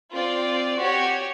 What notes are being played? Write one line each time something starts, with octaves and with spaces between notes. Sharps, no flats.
C4 F4 D5
F#4 G4 C#5